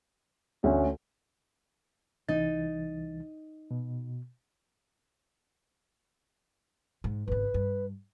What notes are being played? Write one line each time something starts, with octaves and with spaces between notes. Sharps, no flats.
D2 C#4
C2 E3 D#4 A6
B2
G#2
G#1 C#3 B4
G2